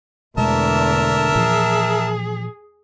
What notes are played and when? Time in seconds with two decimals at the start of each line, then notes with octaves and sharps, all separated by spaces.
0.38 E2 B2 D3 G#3 A3 A#4 E5 A5
1.36 A#2 E3 F3 G#4